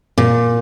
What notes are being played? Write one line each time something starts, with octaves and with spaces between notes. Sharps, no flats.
A#2